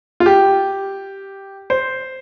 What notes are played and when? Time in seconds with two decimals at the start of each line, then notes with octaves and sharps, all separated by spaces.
0.20 F4
0.26 G4
1.70 C5